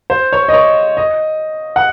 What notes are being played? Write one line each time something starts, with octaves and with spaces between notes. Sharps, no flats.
C5
C#5
D#5
C#5
D#5
F#5